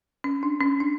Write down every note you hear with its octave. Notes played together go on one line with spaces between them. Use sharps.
C#4
D4
C#4
D4